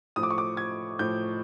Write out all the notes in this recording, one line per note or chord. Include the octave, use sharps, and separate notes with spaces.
A2 F3 D#6
D6
C#6
D6
G#6
A2 F3 G6